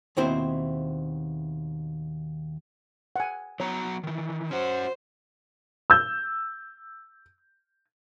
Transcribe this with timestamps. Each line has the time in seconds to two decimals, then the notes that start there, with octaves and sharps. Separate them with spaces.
0.17 D#2 B2 C4 E4 C5 E5
3.16 F#5 G#5
3.60 F#3 B3 C#5 A#5
4.04 D#3 E3
4.51 C#4 F#4 C5
5.90 E6 G6